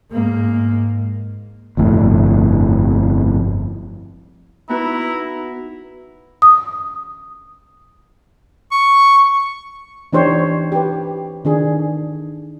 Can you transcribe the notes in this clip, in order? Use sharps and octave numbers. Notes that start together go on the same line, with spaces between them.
G#2 A#3
G1 F2 A2 C3
B3 D#4 E4 F#4 B4 A#5
D#6
C#6
E3 D4 D#4 G4 C5 C#5
G4 B4
D#3 D4 G#4